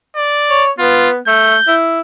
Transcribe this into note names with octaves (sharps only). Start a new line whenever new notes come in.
D5
C#5
B3 F4
A3 G6
E4